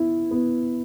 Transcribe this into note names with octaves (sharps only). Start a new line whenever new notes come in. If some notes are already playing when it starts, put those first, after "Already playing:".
Already playing: B3 E4
B3